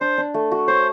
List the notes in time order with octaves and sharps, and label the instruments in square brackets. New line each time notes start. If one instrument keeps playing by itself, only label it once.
[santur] D4 [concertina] C5
[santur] D4
A3
F#4
[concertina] C5 [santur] C#5